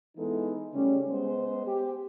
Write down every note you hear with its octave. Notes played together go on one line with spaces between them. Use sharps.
E3 G#3 B3 D#4 E4 A4
C#3 G3 A3 C#4
G#3 B3 C5
G4